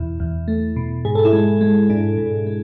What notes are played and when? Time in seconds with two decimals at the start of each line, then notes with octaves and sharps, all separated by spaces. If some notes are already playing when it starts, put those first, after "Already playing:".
Already playing: E2 B2 E4
0.20 E2
0.48 A3
0.76 B2
1.05 G#2 G#4
1.15 A4
1.25 E4 G#4
1.33 G#3
1.61 G#3
1.90 G#2 D4
2.18 G#2
2.47 G#3